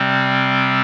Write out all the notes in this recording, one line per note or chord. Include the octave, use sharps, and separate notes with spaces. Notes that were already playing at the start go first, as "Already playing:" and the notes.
Already playing: C3 G3 C4